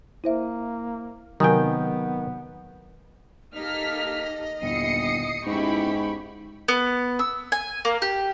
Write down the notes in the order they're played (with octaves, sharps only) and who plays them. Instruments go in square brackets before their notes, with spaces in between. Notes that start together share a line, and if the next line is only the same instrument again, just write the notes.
[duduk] A#3 [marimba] E4 C5 E5
[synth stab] C3 F#3 [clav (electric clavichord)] D#3 G5 [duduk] B3 [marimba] A#4 G#5 D#6
[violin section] A#3 F6 B6 [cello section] D#4 G4 A4 [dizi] D#5
[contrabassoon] G1 [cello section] D#2 A#2 E4 [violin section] D#6 C7 C#7
[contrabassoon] G#2 [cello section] B3 C#4 E4 [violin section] G4 B5 C#6
[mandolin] B3
E6
G#5
A#3
G4